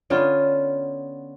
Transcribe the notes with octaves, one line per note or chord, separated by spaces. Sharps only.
D3 B3 C#4 F4